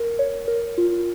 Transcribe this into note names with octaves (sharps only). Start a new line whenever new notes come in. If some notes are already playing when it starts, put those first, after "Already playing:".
Already playing: A#4
C#5
A#4
F4